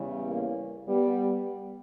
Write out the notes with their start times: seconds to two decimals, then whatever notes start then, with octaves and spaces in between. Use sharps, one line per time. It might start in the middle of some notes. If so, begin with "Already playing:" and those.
Already playing: E2 C#3 E3 G3
0.26 A#3
0.88 G3 B3